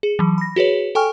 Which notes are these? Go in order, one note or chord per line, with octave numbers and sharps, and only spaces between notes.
G#4
E3 F#3
B5 A#6
F#4 G#4 B4 C#5
A4 G5 G#5 C#6 F6